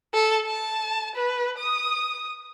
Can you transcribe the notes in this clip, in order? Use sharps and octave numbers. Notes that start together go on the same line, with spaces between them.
A4
A5
B4
D#6